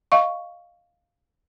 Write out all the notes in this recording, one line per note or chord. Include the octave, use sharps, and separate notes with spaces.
D#5 F5 C#6